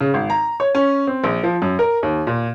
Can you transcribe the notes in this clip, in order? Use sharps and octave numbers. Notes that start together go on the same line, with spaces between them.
C#3
G#1
A#5
C#5
C#4
C4
A#1
F3
F#2
A#4
D#2
A#2